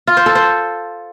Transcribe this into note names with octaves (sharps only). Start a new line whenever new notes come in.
F4
C5
A4
C5